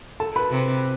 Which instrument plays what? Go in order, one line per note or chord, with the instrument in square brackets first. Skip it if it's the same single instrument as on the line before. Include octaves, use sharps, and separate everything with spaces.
[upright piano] A4 A5
B4 B5
[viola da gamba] C3